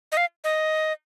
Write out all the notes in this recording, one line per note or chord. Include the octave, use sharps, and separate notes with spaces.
D#5
F5
D#5